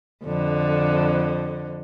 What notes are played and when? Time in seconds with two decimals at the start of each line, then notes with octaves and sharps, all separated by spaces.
0.24 F2 D3